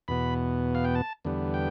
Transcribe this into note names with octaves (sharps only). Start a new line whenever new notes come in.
E2 B2 B3 B5
F5
G5
A5
E2 D3 G3 B3
G5